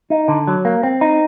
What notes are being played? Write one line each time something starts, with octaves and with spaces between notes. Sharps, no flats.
D#4
D3
F#3
A#3
C4
D#4